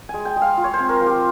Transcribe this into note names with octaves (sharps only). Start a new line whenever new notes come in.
G#3 G#5
G5
G#3
F5
F4
C#5
C5
C4
A#4
F3
G4